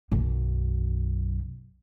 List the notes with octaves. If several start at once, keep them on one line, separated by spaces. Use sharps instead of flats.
B1 F#2